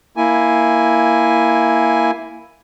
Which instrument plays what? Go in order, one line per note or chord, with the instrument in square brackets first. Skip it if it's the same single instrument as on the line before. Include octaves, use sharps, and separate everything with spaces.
[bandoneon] A#3 E4 G#5